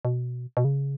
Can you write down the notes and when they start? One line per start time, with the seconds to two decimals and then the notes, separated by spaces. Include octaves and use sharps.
0.05 B2
0.57 B2
0.65 C#3